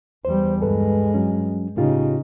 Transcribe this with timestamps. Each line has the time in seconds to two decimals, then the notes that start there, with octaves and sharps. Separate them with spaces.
0.25 E2 G3 C5
0.61 D2 G2 G#3 A4 B4
1.14 F#3 C#4
1.77 A2 C#3 D#4 F4 G4